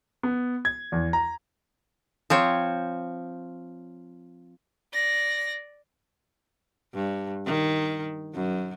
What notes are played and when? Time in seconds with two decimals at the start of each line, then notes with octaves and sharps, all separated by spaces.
0.23 B3
0.65 G#6
0.92 E2
1.13 A#5
2.30 F3 C4 C#5
4.93 D5 A#6
6.95 G2
7.46 D#3
8.35 F#2